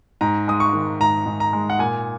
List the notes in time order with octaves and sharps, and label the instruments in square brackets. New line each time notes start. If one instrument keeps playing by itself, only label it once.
[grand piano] G#2 A#5
G#3 D#6
C#6
D#3
G#2 A#5
G#2
A#5
G#3
F#5
A#2 G#5